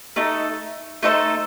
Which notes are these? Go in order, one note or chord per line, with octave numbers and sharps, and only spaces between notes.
A3 D#4 A4
A3 D#4 A4 C5